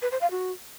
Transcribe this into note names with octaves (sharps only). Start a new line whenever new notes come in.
B4
C5
F5
F#4